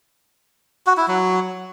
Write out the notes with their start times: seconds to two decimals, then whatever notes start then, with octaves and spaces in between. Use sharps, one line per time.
0.86 F#4
0.97 E4
1.08 F#3